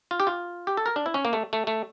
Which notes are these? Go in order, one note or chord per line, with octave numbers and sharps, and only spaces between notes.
F4
G4
F4
G4
A4
A#4
D4
E4
C#4
A#3
A3
A3
A3